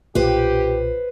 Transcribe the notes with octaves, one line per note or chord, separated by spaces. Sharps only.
B1 A#2 F4 G4 B4 C5